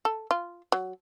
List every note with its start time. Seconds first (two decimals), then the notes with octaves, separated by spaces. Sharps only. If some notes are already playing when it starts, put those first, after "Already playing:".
0.05 A4
0.31 F4
0.72 F#3